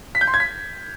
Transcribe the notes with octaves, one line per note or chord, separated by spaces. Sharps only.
B6
G6
C6
G#6
B6